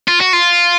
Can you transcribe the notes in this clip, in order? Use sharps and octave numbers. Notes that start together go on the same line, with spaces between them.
F4
F#4
F4